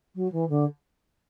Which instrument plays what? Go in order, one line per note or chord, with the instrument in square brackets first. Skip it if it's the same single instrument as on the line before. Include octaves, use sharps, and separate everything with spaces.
[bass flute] F#3
E3
D3